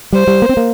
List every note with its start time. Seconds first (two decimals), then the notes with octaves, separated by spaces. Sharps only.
0.13 G3 C5
0.27 G3
0.42 A#3
0.49 C4
0.57 A#3